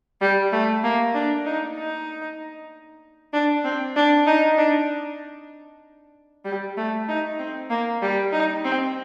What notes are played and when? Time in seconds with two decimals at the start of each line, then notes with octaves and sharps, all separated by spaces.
0.21 G3
0.52 A3
0.83 A#3
1.14 D4
1.45 D#4
1.77 D#4
3.33 D4
3.64 C4
3.96 D4
4.27 D#4
4.57 D4
6.45 G3
6.77 A3
7.08 D#4
7.39 C4
7.70 A#3
8.02 G3
8.32 D#4
8.64 C4